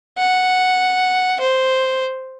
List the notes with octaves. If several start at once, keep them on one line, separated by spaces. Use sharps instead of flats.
F#5
C5